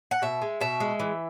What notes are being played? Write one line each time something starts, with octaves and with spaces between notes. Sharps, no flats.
F#5
B2 E5
G#3
B2 E5
G#3
E3